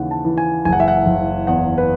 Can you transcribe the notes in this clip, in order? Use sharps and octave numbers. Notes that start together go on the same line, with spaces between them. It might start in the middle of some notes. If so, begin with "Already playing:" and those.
Already playing: D#2 C#3 E3 F#5
A5
E3
G#5
F#1 G#5
F#5
E5
F#5
F#1
E2 F#5
B4